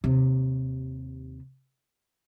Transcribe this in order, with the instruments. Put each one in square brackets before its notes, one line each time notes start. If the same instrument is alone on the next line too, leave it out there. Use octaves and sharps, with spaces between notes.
[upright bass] D#2 C3